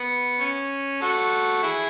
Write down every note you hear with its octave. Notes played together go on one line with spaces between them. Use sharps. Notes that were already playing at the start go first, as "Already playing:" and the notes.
Already playing: B3
C#4
F#4 A4
E4 G#4